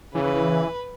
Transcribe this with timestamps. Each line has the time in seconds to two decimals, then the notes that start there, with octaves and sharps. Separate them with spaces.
0.15 C#3 E3 B4